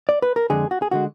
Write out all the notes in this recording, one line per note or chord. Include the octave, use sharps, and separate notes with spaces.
D5
B4
A#4
F2 D3 G#3 G#4
F#4
G#4
D3 G#3 F#4